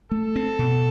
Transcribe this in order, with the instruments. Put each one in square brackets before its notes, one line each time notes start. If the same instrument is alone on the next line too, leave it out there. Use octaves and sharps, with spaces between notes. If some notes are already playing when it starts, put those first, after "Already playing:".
[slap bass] A3 [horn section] A4
[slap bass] C4
B2